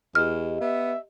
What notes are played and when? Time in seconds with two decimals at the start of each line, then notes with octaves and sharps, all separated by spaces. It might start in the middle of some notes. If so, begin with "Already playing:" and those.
0.15 E2 G4 D#5 F6
0.61 B3 E5